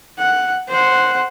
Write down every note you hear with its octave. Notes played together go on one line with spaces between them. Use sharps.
F#5
C5 F#5